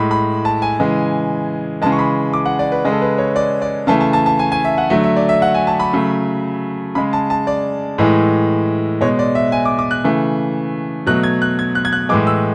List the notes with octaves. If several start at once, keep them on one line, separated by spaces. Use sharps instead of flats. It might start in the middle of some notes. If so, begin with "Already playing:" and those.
Already playing: A2 G#3 B5
B5
A5
G#5
C#3 E3 G#3
C#3 E3 G#3 A5
C#6
B5
D6
F#5
D5
B4
C#3 G#3
A4
B4
C#5
D5
D5
C#3 E3 A3 A5
A5
A5
A5
G#5
G#5
E5
F#5
D3 F#3 A3 E5
E5
D5
E5
F#5
G#5
A5
B5
C#3 F#3 A3
C#3 G#3 B5
A5
A5
D5
A2 E3 G#3
B2 G#3 C#5
D5
E5
G#5
D6
D6
F#6
C#3 E3 A3
B2 F#3 A3 F#6
G#6
F#6
G#6
F#6
G#6
F#6
A2 E3 G#3 D6
E6